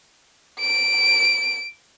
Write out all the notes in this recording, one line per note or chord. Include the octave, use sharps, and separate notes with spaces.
D7